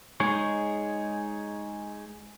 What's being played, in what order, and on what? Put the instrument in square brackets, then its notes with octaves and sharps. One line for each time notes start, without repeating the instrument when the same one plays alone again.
[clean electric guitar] G#3 D#4 G#4 C#5